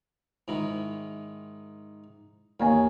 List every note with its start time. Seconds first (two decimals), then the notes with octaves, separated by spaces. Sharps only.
0.48 G#2 D#3 E4
2.60 D#2 A#3 C#5 G#5